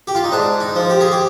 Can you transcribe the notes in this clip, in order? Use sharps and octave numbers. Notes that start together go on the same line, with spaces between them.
G4
F4
D#4
G#2 D4
D#4
F3
G4
G#4
G4